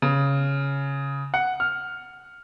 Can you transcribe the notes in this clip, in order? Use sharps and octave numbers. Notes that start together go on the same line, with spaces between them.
C#3
F#5
F6